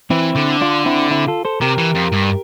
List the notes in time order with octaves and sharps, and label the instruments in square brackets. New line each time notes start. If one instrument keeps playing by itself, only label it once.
[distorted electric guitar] E3 [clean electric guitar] C4 E4
[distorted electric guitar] D3
[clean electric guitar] D4 F4
C4 E4
C4 E4
F4 A4
A4 C5
[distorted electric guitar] C3 [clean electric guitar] G4 A#4
[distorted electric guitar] E3
F2
G2